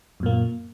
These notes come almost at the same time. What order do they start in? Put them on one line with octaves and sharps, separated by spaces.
F#2 A#2 A#3